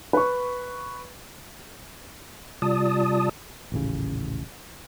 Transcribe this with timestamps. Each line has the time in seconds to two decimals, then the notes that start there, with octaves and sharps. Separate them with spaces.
0.13 B4 C#6
2.62 C3 G3 F4 D5 A5 D#6
3.72 D#1 A1 C#3